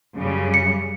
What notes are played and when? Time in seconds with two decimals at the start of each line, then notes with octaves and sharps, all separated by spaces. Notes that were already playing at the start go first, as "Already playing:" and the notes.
0.15 F#2 C#3 G3
0.54 C#7